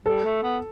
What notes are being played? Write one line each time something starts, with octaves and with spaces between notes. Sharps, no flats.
G3 A4
A3
B3